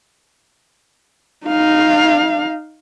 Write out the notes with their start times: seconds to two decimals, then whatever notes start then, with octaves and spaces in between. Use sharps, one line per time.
1.46 D#4 F5